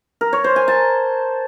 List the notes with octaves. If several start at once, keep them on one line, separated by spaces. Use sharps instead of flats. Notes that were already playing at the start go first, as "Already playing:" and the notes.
A#4
C#5
C5
G#5
A5